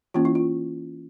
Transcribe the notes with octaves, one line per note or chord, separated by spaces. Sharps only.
E3 A#3 C#4 F4
E4
F4